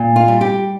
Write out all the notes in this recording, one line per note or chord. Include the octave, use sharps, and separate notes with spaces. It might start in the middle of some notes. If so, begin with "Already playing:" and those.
Already playing: A#2
F4
G3
G4